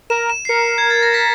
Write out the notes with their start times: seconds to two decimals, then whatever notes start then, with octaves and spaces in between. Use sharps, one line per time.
0.10 A#4 E7
0.30 E7
0.45 C7
0.49 A#4 C#7
0.78 G#6
0.90 A6
1.03 A#6
1.14 B6